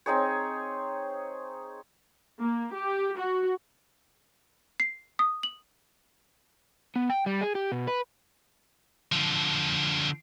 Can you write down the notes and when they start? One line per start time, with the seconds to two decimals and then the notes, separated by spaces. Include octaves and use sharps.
0.06 C4 D#4 G#4 C#5
2.40 A#3
2.74 G4
3.18 F#4
4.80 C7
5.19 D#6
5.43 F#7
6.96 B3
7.10 G5
7.26 G3
7.41 G#4
7.55 G4
7.72 B2
7.87 B4
9.12 D3 F3